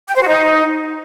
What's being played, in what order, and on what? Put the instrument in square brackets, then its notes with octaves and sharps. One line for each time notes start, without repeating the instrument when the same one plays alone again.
[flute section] G5
C5
F#4
D#4